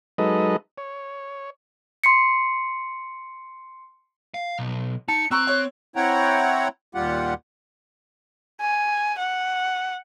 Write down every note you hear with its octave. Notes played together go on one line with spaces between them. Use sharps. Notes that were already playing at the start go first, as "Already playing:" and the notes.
F#3 G#3 D#4 A4 B4 D#5
C#5
C6 C7 C#7
F5
B1
D#4 A5 C#7
C4 A#5 C#6 E6 F#6
C#5
C4 E4 C#5 F#5 G5 A#5
D#2 A#2 G3 F4 G4 F#5
G#5
F#5